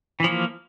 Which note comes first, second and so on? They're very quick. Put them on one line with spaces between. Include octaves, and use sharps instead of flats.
E3 F3 A#3